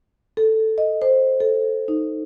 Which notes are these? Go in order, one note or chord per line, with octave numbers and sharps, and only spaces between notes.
A4
D#5
C5
A4
D#4